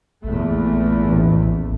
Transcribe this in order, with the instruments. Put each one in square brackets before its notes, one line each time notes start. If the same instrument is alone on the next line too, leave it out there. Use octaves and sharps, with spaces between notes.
[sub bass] A#1 [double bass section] E2 A#2 A3
[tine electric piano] A1 A2